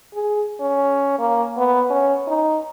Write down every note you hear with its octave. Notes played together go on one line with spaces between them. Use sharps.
G#4
C#4
A#3
B3
C#4
D#4